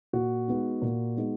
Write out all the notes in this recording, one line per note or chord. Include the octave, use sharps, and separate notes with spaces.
A#2 F#4
G#3 B3 D#4
A#2
G#3 B3 D#4